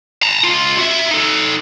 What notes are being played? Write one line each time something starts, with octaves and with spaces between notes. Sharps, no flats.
A5 A#5
C#2 F4
F#4 E5
D#4 A4